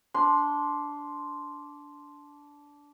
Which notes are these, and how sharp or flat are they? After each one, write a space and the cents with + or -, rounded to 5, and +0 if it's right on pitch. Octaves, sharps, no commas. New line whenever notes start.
D4 -15 C6 +0